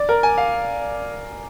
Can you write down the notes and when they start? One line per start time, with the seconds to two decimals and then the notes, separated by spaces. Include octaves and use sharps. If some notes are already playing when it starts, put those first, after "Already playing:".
Already playing: D5
0.09 A#4
0.23 G#5
0.38 F5